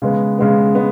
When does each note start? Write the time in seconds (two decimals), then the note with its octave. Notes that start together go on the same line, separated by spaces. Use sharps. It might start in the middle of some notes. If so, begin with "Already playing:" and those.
0.02 C#3 G#3 B3
0.38 C#3 G#3 B3
0.75 G#3 B3